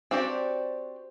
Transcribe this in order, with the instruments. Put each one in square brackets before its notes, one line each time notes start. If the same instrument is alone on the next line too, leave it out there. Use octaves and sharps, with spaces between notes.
[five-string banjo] C4 D4 F#4 G4 D5